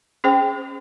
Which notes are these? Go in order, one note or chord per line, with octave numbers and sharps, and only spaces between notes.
C#4 G#4 C5 G5